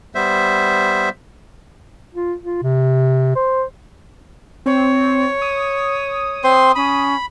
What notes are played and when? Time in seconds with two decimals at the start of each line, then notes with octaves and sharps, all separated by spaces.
0.15 G3 B3 C5 E5
2.15 F4
2.43 F4
2.63 C3
3.36 C5
4.66 C4 C#5
5.42 D#6
6.44 C4 C5 C6
6.75 C#4 B5